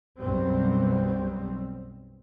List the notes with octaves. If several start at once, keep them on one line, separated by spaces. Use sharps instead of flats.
B1 F#2 F#3 G3 B3 C4